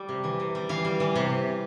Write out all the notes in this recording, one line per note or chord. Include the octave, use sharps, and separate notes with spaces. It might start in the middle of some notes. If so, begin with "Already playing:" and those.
Already playing: G3
C3
E3
C3
G3
E3 F5
G3
E3
C3